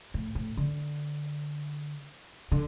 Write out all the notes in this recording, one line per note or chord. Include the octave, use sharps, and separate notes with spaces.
A2
A2
D3
D3